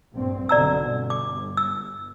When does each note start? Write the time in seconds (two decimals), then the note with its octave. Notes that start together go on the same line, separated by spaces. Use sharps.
0.15 A#1 G2 C4
0.49 B1 B2 D3 D5 A#5 E6
0.80 G1
1.10 D6
1.57 E6